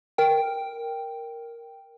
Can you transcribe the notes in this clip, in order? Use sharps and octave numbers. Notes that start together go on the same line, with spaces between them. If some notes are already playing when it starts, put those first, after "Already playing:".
A#4 G5